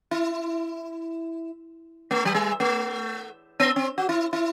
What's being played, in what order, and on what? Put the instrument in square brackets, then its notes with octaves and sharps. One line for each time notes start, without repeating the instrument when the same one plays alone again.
[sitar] E4
A3
F#3
G3
A3
B3
C4
F#4
E4
E4